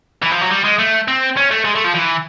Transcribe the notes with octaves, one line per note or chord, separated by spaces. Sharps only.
E3
F3
F#3
G3
G#3
A3
C4
C#4
A3
G#3
A3
F3
E3